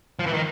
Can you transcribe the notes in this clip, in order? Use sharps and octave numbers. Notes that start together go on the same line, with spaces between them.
F3
E3
D#3